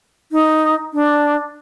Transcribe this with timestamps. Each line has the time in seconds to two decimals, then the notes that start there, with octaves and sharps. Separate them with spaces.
0.32 D#4
0.93 D4